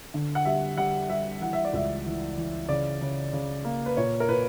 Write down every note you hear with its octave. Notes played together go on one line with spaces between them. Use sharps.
D3
F#5
G3 E5
G3 F#5
G3 E5
E3 F#5
E5
D5
C#2 E5
E3
E3
C#3 D5
C#3
C#3
A#3
B4
A#2 C#5
A#4
A#2 B4